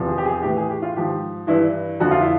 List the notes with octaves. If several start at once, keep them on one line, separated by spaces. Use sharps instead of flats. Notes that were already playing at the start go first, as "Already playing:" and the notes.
Already playing: E2 C3 F3
G#4
G4
G#4
A2 E3 G4
G#4
G4
F4
G#2 F3 G4
G2 E3 E4
F2 D3 F3 F#4
F4
E4